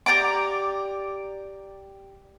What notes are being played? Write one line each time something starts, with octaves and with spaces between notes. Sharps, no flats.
G4 D5 A#5 D6